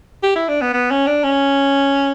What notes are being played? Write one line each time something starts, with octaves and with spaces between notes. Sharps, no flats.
G4
E4
D4
B3
B3
C#4
D4
C#4